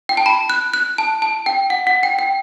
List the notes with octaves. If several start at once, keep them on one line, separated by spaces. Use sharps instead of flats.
G5
A5
B5
F#6
F#6
A5
A5
G5
F#5
F#5
G5
G5